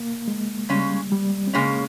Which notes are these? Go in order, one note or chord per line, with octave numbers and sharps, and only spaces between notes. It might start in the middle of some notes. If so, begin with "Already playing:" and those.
Already playing: A#3
G#3
C#3 G3 G#3 C#4
G3
C4
C#3 G#3 A#3 C#4